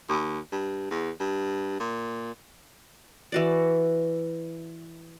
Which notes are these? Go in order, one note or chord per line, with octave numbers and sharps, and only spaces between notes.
D#2
G2
E2
G2
A#2
E3 F#4 D5